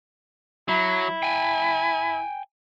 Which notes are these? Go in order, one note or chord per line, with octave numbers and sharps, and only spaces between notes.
F#3 E4
G5 G#5